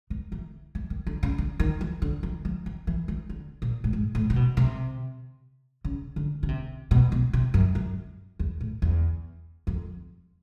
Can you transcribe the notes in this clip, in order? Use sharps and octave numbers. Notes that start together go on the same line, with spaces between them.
D#3
E3
E3
D#3
D3
C#3
D3
D#3
E3
D3
E3
F3
E3
E3
D#3
D3
A#2
A2
G#2
A2
C3
B2
C3
C#3
D3
C#3
C3
B2
B2
C3
F#2
F#2
E2
A2
E2
F2